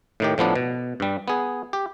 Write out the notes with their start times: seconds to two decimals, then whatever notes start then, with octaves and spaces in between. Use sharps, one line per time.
0.20 A2 D#3 G4
0.38 A2 F3 B3 D4
0.55 B2
1.00 G2 G3
1.28 B3 G#4
1.73 G4